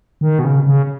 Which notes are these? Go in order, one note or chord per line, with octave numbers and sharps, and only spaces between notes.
D#3
B2
C#3
C#3